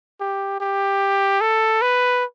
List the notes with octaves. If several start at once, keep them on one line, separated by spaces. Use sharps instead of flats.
G4
G4
A4
B4